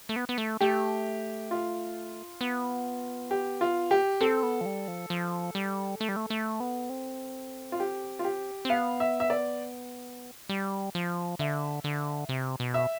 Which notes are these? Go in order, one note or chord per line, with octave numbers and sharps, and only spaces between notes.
A3
B3
B3
A3
A3 G4
F4
B3
G4
F4
G4
C4 A4
B3
F3
G3
F3
F3
G3
A3
G3
A3
A3
B3
C4
F4
G4
F4
G4
C4
B3 F5
E5
E5
D5
G3
F3
D3 E5
D3
C3
B2
E5